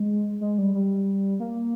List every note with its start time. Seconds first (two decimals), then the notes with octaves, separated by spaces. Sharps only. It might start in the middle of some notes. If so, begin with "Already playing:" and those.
Already playing: G#3
0.41 G#3
0.58 G3
0.74 G3
1.40 A#3